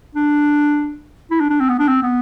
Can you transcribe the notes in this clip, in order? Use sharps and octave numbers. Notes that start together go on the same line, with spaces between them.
D4
E4
D4
D4
C4
B3
D4
C4
B3